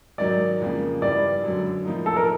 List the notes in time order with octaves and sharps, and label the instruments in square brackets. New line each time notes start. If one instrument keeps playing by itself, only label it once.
[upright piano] G#2 D#3 F#3 [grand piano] D5
[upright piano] F2 C#3 F3 A#3
[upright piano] G2 E3 G3 [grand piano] D5
[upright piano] F#2 D3 F#3
A2 F3 A#3 D#4
[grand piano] A4
A#4